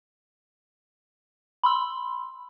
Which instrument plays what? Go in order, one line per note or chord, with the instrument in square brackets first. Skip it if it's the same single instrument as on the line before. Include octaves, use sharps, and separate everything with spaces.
[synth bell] B5 C6 E6